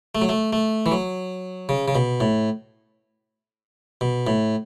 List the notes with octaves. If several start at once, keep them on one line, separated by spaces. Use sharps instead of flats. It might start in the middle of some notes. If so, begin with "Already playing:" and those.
A3
F#3
A3
A3
E3
F#3
C#3
C#3
B2
A2
B2
A2